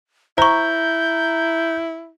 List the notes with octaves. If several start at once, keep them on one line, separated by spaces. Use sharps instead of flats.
E4 C5 A#5 C#6 G6